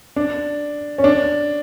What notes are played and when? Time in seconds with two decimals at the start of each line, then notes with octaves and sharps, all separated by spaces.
0.16 D4
0.98 C#4
1.04 D4